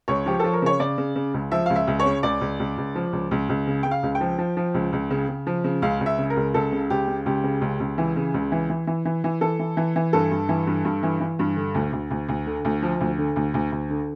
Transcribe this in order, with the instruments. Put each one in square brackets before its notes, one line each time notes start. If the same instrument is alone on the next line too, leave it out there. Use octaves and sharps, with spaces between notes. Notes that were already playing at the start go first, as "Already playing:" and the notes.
[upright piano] C#2 C#5
F3 G4
F3 A4
A#4
C#3 C#5
C#3 D5
C#3
C#3
C#2
F3 E5
C#2 F5
E5
C#2
C#5
C#3
C#2 D5
C#2
C#2
C#2
F3
C#2
C#2
C#2
C#3
C#3 G5
F5
C#2
G5
F3
F3
F3
C#2
C#2
C#3
C#3
F3
C#3
C#2 F5
C#2
E5
C#3
A#4
C#2
C#2 A4
C#3
C#2 G4
C#3
C#2 G4
C#3
C#2
C#2
E3
C#3
C#2
E3
E3
E3
E3
E3
E3 A4
E3
E3
E3
G2 A4
G2
E3
G2
G2
E3
E3
G2
D3
D2
D2
D2
D2
D3
D2
F3
D2
D3
D2
D2
D2
D3